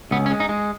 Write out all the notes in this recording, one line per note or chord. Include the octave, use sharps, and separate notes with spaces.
C#2 B3
C#4
G#3
D#4
G#3